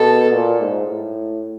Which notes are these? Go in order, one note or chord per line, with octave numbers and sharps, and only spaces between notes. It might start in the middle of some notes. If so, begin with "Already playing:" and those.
Already playing: B2 A4
A#2
G#2
A2